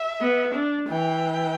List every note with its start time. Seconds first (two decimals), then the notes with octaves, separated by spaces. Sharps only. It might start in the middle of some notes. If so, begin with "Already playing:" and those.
Already playing: E5
0.21 B3
0.55 D4
0.90 E3 G5